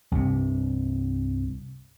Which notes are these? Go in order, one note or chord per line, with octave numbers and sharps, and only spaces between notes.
C2 G2 C3